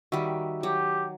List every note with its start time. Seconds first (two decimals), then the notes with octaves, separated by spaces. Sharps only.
0.12 D#3 G3 F#4 E5
0.63 F#3 G4